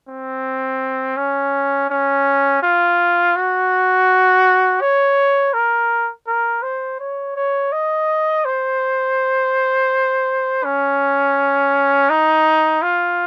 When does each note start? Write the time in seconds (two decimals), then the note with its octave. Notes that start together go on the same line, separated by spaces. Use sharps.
0.08 C4
1.17 C#4
1.90 C#4
2.63 F4
3.36 F#4
4.81 C#5
5.53 A#4
6.27 A#4
6.63 C5
7.00 C#5
7.36 C#5
7.72 D#5
8.45 C5
10.64 C#4
12.10 D#4
12.82 F4